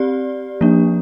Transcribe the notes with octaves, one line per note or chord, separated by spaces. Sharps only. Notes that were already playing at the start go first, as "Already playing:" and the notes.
Already playing: C4 G4 D5
F3 A#3 D4